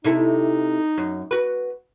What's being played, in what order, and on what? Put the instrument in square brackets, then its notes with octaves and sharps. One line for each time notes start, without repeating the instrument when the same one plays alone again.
[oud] C3 E4 A4 [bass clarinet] D#4
[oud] F#2
F#4 B4